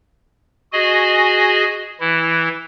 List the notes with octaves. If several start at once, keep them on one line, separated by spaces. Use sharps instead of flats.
F#4 G#4 D#5 G#5
E3 E4